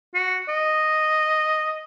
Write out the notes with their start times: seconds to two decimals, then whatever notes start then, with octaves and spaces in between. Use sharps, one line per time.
0.15 F#4
0.49 D#5